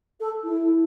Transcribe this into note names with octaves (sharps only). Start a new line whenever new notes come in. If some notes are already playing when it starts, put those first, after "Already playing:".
A4
E4